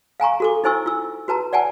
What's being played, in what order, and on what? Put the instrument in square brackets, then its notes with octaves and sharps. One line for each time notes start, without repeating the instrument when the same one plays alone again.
[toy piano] F5 G#5 A#5 C#6
F#4 A4 D6
D#4 E4 C5 G#5 C#6 E6
F4 E6
F#4 B4 A5 A#5
D5 F#5 G#5 A5